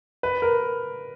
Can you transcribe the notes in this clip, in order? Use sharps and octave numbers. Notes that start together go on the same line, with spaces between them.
B4
A#4